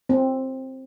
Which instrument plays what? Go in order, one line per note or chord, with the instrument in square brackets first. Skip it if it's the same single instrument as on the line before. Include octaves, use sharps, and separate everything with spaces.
[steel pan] C4